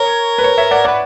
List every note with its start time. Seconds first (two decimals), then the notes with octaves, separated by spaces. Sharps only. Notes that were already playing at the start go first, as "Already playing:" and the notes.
Already playing: A#4 C#5
0.38 B4
0.44 C#5
0.58 C#5 E5
0.71 D5 F#5
0.85 D5 F#5
0.88 B4